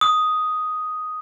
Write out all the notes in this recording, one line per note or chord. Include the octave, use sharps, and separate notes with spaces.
D#6